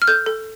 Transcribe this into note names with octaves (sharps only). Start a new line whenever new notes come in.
F6
A4 G6
A4